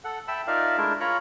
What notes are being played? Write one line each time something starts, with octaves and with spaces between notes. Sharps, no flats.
A4 F#5
E5 G5 A5 B5 E6
D#4 F4 A#4 D5 E5 F5
G#3 A3 D4 E4 A#4
F4 A#4 C#5 A#5 B5 C#6